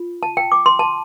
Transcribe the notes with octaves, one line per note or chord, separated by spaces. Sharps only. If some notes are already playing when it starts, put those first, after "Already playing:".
Already playing: F4
A5
G5
D6
C6
A5